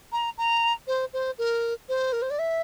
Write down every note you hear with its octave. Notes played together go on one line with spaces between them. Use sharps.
A#5
A#5
C5
C5
A#4
C5
A#4
C5
D5
E5